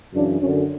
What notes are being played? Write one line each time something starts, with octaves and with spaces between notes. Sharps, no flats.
F#2 C#3 E3 D4
F#2 D3 C#4